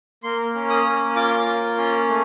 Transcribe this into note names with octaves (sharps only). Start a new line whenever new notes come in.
A#3 C6
C#4
D#6
A#3
F4 D6
A#3
C#4
A3